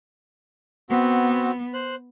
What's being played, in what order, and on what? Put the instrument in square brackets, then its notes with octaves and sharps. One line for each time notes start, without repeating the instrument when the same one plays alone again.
[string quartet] B3 [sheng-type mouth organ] C4 F#4
[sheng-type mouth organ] C5 F#6